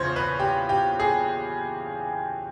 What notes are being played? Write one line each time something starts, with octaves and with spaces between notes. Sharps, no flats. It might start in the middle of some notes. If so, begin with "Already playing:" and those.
Already playing: E2 C#3 F3 C5 C#5
B4
G4
G4
G#4